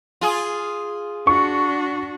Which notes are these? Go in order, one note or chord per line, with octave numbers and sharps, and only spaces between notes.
F4 G#4
D4 F#4 C#6